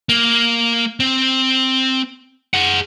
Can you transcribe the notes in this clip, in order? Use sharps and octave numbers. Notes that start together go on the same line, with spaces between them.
A#3
C4
G#4 F#5